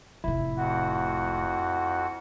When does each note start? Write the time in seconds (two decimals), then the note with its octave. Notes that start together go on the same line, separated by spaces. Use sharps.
0.24 F1 A2 E4
0.57 F2 F#4 F#5